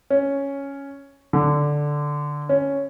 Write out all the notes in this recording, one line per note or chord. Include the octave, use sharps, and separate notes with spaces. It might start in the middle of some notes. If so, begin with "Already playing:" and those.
C#4
D3
C#4